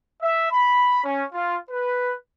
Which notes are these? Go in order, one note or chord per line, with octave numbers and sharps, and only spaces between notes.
E5
B5
C#4
F4
B4